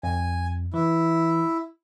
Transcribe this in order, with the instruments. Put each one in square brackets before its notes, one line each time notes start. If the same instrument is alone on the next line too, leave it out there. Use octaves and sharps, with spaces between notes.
[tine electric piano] F2 [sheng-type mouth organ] G#5
[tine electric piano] E3 [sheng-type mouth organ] E4